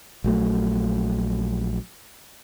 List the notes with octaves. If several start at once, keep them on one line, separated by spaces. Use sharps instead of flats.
A#1 F#3 A3